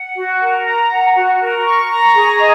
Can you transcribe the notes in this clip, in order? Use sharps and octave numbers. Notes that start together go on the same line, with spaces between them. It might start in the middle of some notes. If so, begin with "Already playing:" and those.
Already playing: F#5
F#4
A#4
A#5
F#5
F#4
A#4
C#6
A#5
G#4
D#5